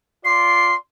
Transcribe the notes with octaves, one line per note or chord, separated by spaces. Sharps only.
F4 D5 C6 C7